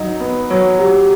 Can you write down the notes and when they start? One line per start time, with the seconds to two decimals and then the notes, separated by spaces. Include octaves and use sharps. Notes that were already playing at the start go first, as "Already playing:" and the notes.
Already playing: F#3 D#4
0.20 B3
0.50 F#3 C#5
0.79 F#3 G4